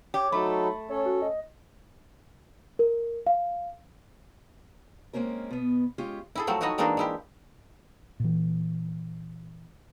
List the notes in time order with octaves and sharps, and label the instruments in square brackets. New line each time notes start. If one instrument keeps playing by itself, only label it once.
[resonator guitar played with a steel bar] G4 [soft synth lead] C#5
[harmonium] F#3 D#4 A4 [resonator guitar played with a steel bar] A3 [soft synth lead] B5
[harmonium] C#4 A4 [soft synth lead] C#5
[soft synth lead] F#4
D#5
[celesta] A#4
F5
[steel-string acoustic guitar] G#3 A#3 C4 C#4 A#4
B2 B3
G#3 C#4 F4 G4
[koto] E4 G#4 A4
F3 F#3 A3 C4
D#4 E4 F#4 C#5 D#5
E3 G#3 A#3 C4 D4 D#4
G#3 E4 G4
[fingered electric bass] A#2 E3